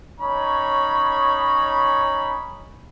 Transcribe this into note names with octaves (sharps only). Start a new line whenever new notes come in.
C#4 D#4 C#5 B5